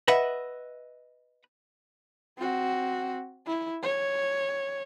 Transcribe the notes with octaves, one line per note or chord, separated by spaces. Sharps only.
B4 D#5 E5 F#5
C4 F#4
E4
C#5